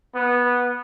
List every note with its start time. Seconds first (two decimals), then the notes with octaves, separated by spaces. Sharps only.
0.15 B3